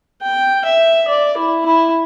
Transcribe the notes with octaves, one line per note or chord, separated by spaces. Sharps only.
G5
E5
D5
E4
E4